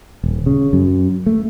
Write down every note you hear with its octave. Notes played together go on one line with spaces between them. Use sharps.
D#1
C#3
F#2
A3